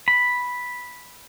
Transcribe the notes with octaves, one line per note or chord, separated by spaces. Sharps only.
B5